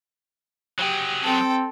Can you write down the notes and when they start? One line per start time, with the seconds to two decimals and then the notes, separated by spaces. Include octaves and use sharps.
0.78 F#3 G4 G#4
1.23 C4 A4 G5